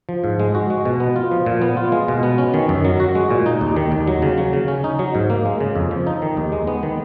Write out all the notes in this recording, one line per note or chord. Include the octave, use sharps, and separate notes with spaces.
F3
G#2
G#3
F#4
G#3
B2
B3
F4
F3
A#2
B3
F4
G#3
B2
B3
C#4
D#3
F#2
F#3
F#4
G#3
A#2
D#4
D#2
D#3
D#2
F#3
C#3
F#3
C#3
C#4
D#4
F#3
G#2
A#3
G#3
C#3
F2
F3
D#4
D#3
D#2
G#3
B3
D#3